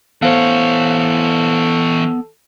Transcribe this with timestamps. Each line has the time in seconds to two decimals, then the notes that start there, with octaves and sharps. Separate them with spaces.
0.22 E3 B3 A4 C5 C#5 F5